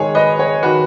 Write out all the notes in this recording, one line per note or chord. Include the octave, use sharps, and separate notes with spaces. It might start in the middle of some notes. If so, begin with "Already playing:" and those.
Already playing: G#2 D#3 G#4 C#5
B4 D#5
G#4 C#5
D#3 F#4 B4